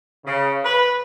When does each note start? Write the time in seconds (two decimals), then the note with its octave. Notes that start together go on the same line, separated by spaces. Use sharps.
0.25 C#3
0.64 B4